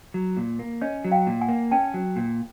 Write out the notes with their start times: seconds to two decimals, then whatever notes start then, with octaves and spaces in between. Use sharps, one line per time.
0.14 F#3
0.37 A#2
0.59 A#3
0.81 C#4 C#5 D#5
1.05 F#3
1.12 F5 G5
1.27 A#2
1.41 F#5 G#5
1.49 A#3
1.71 C#4 G5 A5
1.94 F#3
2.16 A#2